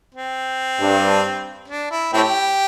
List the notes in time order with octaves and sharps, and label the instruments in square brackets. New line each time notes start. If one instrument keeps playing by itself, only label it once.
[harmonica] C4
[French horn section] G2
[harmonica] D4
E4
[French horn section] A2 [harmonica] C4 E4 G4